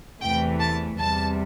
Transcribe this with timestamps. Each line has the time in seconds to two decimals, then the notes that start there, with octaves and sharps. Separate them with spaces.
0.21 E2 C3 E3 A3 G5
0.59 A5
0.98 E2 C3 G3 A5